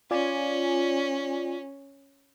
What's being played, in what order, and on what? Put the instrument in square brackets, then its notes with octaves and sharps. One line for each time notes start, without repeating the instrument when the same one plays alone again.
[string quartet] C#4 [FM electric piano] F4 D5 G#5